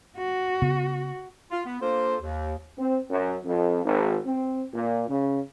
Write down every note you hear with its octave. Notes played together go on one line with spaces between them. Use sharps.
F#4
C#3 B3
F4
B3
A#3 D4 F4 A4 C5
D#2
C4
F#2
F2
G#1
C4
A#2
C#3